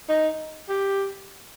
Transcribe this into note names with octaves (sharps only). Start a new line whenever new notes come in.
D#4
G4